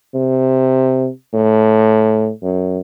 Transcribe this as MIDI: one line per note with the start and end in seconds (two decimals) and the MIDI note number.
0.14 1.08 48
1.33 2.30 45
2.42 2.79 42